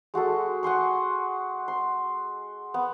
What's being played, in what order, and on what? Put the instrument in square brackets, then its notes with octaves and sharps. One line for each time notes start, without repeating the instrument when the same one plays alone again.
[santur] G#3 F#4 G#4 A4
F#5 G#5 C6 C#6
C6
B3